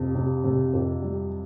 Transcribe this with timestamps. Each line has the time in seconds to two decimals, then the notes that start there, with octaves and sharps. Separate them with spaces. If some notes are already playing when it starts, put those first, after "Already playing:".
Already playing: F2 C3
0.15 C3
0.44 C3
0.73 F2
1.02 G3